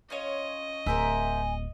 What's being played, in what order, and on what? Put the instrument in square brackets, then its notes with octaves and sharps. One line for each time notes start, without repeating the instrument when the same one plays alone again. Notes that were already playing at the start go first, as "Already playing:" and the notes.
[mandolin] C#4 F4 C#5 [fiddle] D#5
[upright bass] D1 [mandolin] A#4 C5 E5 [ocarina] G#5